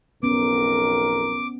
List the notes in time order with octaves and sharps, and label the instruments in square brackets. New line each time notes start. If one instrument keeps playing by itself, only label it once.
[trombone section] B1 F2 A#4 [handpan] B3 C#4 [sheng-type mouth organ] D6